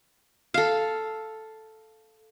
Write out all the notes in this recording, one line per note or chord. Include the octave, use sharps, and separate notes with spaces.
A4 F5